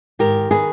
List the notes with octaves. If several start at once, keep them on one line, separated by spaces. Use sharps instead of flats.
G#2 D#3 G4 A#4
D#3 G#4 B4